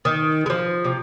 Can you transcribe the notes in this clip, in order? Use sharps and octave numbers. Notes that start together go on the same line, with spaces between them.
D#3
G#3
F3
C3